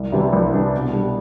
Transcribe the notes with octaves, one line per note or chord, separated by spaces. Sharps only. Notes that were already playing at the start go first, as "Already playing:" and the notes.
Already playing: C2
C3 E3 G3 D4
C2
C3 E3 G3 D4
B2
G3 D4